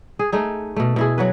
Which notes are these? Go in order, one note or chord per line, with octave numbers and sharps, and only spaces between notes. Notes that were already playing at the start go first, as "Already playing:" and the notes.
G#4
A3 D#4 G#4
B2 A3
B2 E4 G#4
F#3 F#4 B4